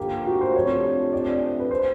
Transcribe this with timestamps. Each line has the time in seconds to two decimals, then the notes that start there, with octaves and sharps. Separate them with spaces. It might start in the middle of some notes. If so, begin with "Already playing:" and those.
Already playing: D3 F3 A#3 G4
0.26 F#4
0.41 C5
0.55 F2 C3 F3 A3 D4 C#5
1.13 D5
1.60 B4
1.71 C5